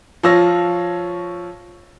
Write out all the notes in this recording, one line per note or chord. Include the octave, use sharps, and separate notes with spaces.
F3 F4 C#5 E6 A#6